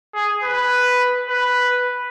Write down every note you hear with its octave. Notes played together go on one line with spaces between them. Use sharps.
G#4
B4
B4